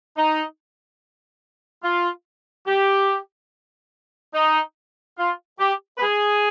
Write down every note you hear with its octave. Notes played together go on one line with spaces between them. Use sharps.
D#4
F4
G4
D#4
F4
G4
B4
G#4